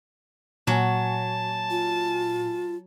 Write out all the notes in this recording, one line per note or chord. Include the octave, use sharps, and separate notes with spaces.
A#2 F#3 G#5 A5
F4